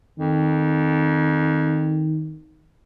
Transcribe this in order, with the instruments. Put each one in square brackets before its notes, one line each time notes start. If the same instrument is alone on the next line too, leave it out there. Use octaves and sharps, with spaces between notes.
[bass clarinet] F2 [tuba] D#3